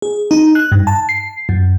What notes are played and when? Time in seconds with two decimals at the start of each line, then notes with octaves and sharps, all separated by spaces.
0.02 G#4
0.31 D#4
0.55 F#6
0.72 G2
0.87 A5
1.09 C7
1.49 F#2